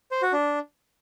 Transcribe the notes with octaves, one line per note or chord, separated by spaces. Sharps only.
C5
F#4
D4